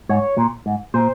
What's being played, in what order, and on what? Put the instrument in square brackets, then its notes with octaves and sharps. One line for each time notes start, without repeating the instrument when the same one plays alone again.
[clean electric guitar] G#2 [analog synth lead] C#5
[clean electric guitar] A#2
G#2
[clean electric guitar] A#2 [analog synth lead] C5